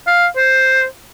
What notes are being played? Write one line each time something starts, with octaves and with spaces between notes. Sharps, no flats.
F5
C5